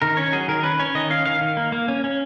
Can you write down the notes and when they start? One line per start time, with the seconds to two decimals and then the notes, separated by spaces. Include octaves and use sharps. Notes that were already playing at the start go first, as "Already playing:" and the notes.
0.02 D#3 A#4
0.17 C#4 C#5
0.33 F#3 G#4
0.48 D#3 A#4
0.63 C#4 B4
0.80 C#4 C#5
0.95 D#3 D#5
1.10 C#4 F5
1.26 D#3 F5
1.41 D#3
1.57 A#3
1.72 A#3
1.88 C#4
2.04 C#4